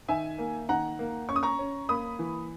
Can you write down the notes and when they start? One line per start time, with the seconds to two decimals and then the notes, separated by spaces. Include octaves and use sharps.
0.08 D#3 E5 G#5
0.38 A#3
0.69 D#3 F#5 A#5
0.99 A#3
1.29 C#4 C#6
1.36 D#6
1.43 A#5 C#6
1.59 C#4
1.89 A#3 B5 D#6
2.19 E3